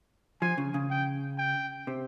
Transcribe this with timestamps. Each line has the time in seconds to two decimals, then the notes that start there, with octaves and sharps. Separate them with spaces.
0.42 F3 G#5
0.58 C#3
0.74 C#3
0.91 G5
1.38 G5
1.87 C3